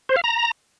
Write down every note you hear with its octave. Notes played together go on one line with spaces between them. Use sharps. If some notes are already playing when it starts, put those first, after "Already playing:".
C5
F5
A#5